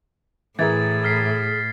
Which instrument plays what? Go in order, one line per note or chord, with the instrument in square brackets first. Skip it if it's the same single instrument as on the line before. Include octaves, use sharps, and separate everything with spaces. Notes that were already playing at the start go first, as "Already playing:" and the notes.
[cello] A2 [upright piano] E3 E4 A#4 [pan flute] G#4 [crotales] G#6 A6
[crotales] F6 B6 C7